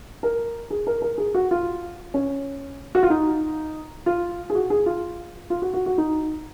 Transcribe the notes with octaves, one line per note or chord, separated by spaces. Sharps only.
A#4
G#4
A#4
A#4
G#4
F#4
F4
C#4
F#4
F4
D#4
F4
G#4
F#4
G#4
F4
F4
F#4
F#4
F#4
D#4